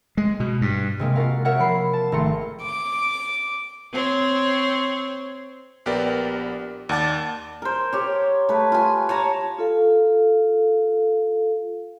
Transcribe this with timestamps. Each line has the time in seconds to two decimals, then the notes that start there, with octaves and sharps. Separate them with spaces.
0.17 G#3
0.40 B2
0.62 G2
1.00 C3 G#3 A#3
1.15 F4 F#4 A#4 F5
1.45 A#4 C#5 E5 F#5
1.59 F3 B5 C7
1.93 A5
2.12 G#1 A3 A#5 C6 C#7
2.62 D6
3.93 C4 C5 C#5
5.86 A#1 B3 G4 A#4 D5
6.89 D#2 D5 F#5 A5 D6 A6
7.62 A#4 C5
7.93 G4 C#5
8.49 A3 B4
8.72 F4 G#5
9.09 C#5 A5 A#5
9.58 F4 A4 F5